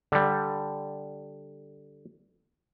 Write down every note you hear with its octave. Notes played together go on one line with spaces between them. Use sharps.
D3 G3